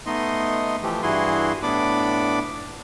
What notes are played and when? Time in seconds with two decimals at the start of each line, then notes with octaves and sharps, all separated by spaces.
0.06 A3 B3 D#4 D#5 C6
0.83 E3 F3 A3 G4
1.03 G2 E3 E4 F#4 G#4 C6
1.63 A2 B3 D4 B5 D6